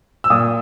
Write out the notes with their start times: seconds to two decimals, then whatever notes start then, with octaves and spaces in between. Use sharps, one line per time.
0.24 E6
0.30 A#2 D#6